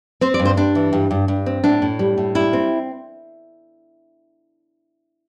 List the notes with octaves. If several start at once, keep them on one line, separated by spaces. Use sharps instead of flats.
C4 C5
D5
G2
C5
G2 D4
E3
G2
G2
G2
C4
A2 D4
A2
G3
A2
G3 E4
C4